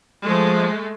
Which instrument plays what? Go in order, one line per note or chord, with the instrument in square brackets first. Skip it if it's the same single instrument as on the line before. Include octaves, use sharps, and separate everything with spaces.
[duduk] F3 [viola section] G#3 A3